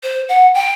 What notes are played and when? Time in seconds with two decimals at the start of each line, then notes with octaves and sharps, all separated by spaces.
0.03 C5
0.29 F#5
0.54 G5